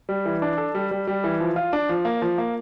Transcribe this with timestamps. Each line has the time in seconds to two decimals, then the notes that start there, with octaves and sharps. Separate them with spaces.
0.09 G3
0.25 E3
0.42 D4
0.58 A4
0.75 G3
0.91 G3
1.07 G3
1.24 E3
1.40 F3
1.56 F4
1.73 D4
1.89 F3
2.05 A#3
2.22 F3
2.38 A#3